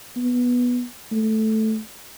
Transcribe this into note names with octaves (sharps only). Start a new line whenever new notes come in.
B3
A3